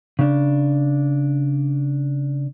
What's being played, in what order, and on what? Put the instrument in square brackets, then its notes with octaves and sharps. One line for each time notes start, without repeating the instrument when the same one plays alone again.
[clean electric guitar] C#3 D4